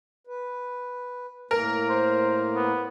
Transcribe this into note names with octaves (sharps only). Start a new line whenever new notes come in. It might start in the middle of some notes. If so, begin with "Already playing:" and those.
B4
A2 A#3 A#4
C5
B3